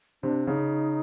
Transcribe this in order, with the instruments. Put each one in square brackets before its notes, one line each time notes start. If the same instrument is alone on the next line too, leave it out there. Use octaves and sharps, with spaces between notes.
[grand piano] C3 [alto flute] D4
[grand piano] C#3 [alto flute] D#4